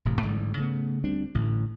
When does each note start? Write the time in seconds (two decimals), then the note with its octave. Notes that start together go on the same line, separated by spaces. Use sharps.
0.05 E1 A2 C3
0.23 A1 G#2 D3 G3
0.57 C#3 A3 B3
1.04 D2 G3 C4 D4
1.35 A1 A2 D3